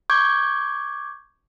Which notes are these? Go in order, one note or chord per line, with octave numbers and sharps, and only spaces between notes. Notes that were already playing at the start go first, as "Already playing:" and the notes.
C#6 D6 G6 G#6